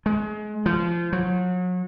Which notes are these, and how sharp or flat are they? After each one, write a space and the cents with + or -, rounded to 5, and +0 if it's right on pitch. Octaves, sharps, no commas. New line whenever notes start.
G#3 +30
F3 -25
F#3 -35